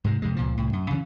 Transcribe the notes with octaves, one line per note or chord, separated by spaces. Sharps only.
G#2 C3 G#3
F2 C3 G#3
C#2 A#2 F3
C2 A2
F#2
C#3 E3 G3 C#4